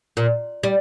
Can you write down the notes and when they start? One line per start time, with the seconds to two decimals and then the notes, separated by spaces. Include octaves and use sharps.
0.17 A#2
0.63 G3